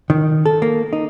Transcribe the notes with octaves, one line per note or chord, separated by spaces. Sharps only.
D#3
A4
A#3
D#4